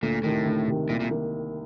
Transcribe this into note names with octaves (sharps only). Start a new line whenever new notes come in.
D2 A#2
A2 C3 D#3
D2
C3 D#3
C2 A#2
A#2
D#3 A#3